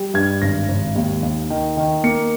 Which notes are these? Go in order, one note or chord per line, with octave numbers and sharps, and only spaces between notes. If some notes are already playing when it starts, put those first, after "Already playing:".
Already playing: G3
G2 G#6
G#1 A#6
G#1
D#2
D#2
D#3
D#3
A#3 C#7